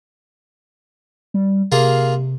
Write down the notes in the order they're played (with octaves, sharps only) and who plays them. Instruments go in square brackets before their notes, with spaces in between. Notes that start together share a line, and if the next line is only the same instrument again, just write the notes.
[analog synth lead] G3
[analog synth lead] C3 [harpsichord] A#3 F4 G#4